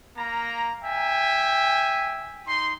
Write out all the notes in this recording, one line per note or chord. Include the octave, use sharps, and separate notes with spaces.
A#3 A#5
E5 G5 G#5
D#4 C6